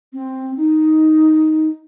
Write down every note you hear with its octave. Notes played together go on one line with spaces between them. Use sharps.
C4
D#4